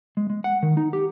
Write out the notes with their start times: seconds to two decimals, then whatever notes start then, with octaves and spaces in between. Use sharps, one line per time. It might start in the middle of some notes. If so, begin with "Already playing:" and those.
0.17 G#3
0.30 G#3
0.44 F#5
0.63 D#3
0.77 D#4
0.93 G4